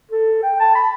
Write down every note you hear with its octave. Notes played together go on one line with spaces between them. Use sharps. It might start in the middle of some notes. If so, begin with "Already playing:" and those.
A4
G5
A5
B5